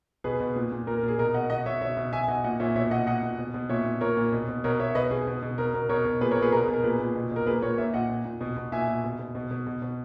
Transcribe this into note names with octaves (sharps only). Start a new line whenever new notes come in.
B2 G#4 B4
B2
A#2
A#2
A#2 A#4
A#4
A#2
G#4
B2 A#4
B2 D#5 F#5
B2 D#5 F#5
B2 C#5 E5
B2 C#5 E5
B2
B2 E5 G#5
G#5
B2 D#5 F#5
A#2 D#5 F#5
A#2 C#5 E5
B2 C#5 E5
B2 D#5 F#5
A#2 D#5 F#5
A#2
B2
B2
A#2 C#5 E5
A#2
A#2 A#4 C#5
A#2
B2
B2
B2 A#4 C#5
B2 C#5 E5
B2 B4 D#5
B2 G#4
B2
B2
B2 A#4
B2 A#4
B2 A#4 C#5
B2
A#2 G#4 B4
A#4 C#5
A#2
G#4 B4
B2 A#4
G#4
B2
A#4
A#2 G#4 B4
A#2
B2
B2 A#4
A#2 G#4 B4
A#2 A#4 C#5
A#2 C#5 E5
A#2 D#5 F#5
A#2
A#2
B2
B2
A#2 E5 G#5
A#2
B2
B2
B2
B2
B2
B2